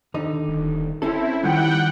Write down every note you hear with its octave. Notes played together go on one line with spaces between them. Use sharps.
D#2 D3 D#4
D#1
C4 C#4 E4 A4
D#3 F3 G3 F#5 G5